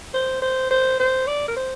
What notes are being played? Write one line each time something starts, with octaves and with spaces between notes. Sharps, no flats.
C5
C5
C5
C5
D5
A#4
C5